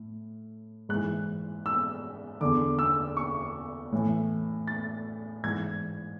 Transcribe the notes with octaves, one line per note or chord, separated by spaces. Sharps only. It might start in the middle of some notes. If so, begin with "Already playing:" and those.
Already playing: A2
G#2 E3 F#6
E6
E2 D3 D6
E6
C#6
A2 E3
A6
G#2 E3 G#6